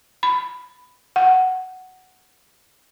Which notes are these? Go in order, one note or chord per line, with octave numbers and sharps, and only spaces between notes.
B5
F#5